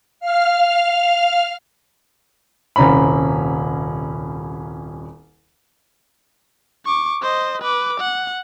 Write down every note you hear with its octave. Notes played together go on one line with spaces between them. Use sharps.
F5 F6
D#1 C2 C#4 A#5 B5
C#6 D6
C5 D#5
B4 D6
F#5